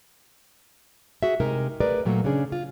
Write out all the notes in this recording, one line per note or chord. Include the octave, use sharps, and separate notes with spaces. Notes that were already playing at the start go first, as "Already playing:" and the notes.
F#4 G#4 E5
C3 G#3 D#4 A#4
A3 G#4 A#4 B4 D5
A#2 F#3 A3 A#3
C#3 C#4 D4 G#4
F4